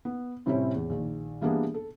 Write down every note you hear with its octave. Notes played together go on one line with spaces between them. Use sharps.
B3
A2 C3 G3 C4 C#4 E4
E2
A#1 D#3
E3 G3 A#3 B3 D4 G#4
A4